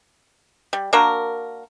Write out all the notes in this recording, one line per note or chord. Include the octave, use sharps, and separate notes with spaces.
G3
A#3 D4 F#4 A#4